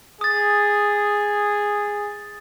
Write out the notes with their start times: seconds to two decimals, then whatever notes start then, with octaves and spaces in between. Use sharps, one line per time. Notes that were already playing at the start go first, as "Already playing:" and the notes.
0.21 G#4 D#6 A6